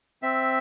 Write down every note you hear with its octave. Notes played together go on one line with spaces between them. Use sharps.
C4 E5